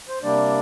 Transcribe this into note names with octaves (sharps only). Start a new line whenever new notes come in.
C5
C3 G3 A#3 D4 D5